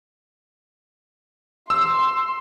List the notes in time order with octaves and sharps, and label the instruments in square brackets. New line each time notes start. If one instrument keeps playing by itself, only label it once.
[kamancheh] C6 [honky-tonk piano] E6